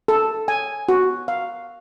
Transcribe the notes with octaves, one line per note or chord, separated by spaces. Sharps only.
A4
G#5
F#4
F5